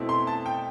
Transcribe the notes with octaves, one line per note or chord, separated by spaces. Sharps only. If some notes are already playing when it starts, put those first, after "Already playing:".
Already playing: B2 A3 C4 E4
C6
A5
G5